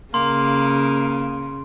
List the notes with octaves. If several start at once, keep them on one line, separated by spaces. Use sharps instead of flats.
C#3 A#3 C6